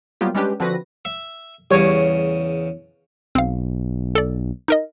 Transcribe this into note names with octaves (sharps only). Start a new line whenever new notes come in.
F#3 G3 A#3 B3 F4 G4
G3 G#3 C#4 D4 G4 B4
D3 F3 C4 F#4 B4 A#6
E5
E2 C#3 G3 C#5
B1 C4 F5
A4 D5
D#4 A#4 D#5